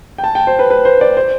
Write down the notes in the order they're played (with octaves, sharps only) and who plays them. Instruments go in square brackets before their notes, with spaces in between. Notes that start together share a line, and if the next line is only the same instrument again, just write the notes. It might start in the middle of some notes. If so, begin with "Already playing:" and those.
[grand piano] G5
A5
G5
C5
B4
B4
C5
D5
C5